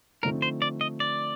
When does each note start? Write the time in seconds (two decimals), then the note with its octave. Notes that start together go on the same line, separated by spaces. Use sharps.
0.23 D3 F3 A3 C4 D#4 A#4
0.42 C5
0.62 D5
0.81 D#5
1.00 D5